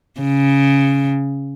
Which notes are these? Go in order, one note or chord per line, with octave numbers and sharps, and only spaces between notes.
C#3